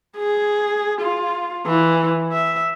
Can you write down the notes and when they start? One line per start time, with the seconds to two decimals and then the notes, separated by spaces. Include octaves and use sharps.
0.17 G#4
1.02 F4
1.67 E3
2.32 E5